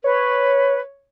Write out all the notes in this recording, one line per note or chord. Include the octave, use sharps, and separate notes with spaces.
B4 C#5